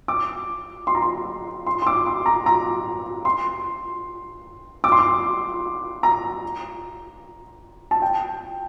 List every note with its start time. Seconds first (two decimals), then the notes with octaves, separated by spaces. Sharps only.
0.08 D6
0.87 C6
0.95 A#5
1.02 C6
1.66 C6
1.82 C6
1.87 D6
2.06 C6
2.26 A#5
2.46 A#5
3.25 C6
4.84 D6
4.92 C6
4.99 D6
6.03 A#5
7.91 A5
8.02 G5